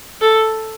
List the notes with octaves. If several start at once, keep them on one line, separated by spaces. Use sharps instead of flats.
A4